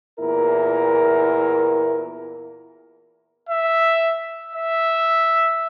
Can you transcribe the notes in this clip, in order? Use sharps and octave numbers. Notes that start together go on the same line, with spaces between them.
E2 A#2 E4 A#4
E5
E5